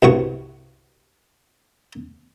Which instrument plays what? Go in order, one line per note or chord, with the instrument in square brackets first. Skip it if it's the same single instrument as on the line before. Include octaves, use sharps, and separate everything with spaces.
[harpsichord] C2 G2 F#4 C#6